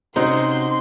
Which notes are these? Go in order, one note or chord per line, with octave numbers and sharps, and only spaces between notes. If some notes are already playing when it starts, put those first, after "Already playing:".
C3 C#4 D#4 F#4 C5 C6